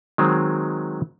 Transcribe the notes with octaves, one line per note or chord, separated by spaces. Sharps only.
D#3 F#3 G#3 C4